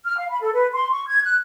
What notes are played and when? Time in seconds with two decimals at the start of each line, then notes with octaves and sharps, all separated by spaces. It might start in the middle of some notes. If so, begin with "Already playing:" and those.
0.05 F6
0.18 F5
0.30 B5
0.42 A4
0.54 B4
0.73 C6
0.91 C#6
1.08 G#6
1.24 F#6